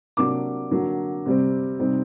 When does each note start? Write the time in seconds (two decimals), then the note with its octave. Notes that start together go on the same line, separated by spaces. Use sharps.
0.17 C3 F#3 A#3 D4 D6
0.71 D3 F#3 A#3
1.26 C3 G3 C4
1.79 C3 G3 C4 D#4